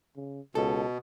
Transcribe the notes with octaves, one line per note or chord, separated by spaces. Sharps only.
C#3
C#2 B2 A4